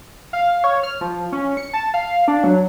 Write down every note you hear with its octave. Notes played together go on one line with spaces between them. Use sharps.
F5
C#5
F6
F3
C#4
C#7
A5
F5
D4
F#3